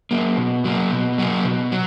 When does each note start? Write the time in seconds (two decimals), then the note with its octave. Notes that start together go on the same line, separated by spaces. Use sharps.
0.11 F#3 A#3
0.37 B2
0.64 F#3 A#3
0.92 B2
1.18 F#3 A#3
1.45 B2
1.72 F#3